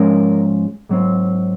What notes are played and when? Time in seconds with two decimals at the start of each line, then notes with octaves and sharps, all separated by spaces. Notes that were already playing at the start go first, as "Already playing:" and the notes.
Already playing: G#2 F3 G#3 C#4 A#4
0.89 G#2 F#3 C4